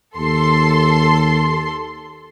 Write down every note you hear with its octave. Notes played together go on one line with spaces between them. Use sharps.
D#2 A4 C6